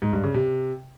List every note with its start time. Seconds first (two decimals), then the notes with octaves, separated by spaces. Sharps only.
0.02 G#2
0.13 G2
0.24 C#3
0.34 C3